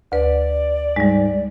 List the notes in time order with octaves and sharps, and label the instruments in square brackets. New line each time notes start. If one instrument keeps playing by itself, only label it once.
[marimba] D2 B4 [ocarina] D5
[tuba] G#2 [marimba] G3 G#3